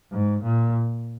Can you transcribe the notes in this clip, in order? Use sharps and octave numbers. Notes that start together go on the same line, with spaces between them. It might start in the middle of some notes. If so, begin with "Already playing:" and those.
G#2
A#2